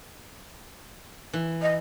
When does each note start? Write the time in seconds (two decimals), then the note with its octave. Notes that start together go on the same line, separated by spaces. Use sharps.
1.33 E3
1.62 D#5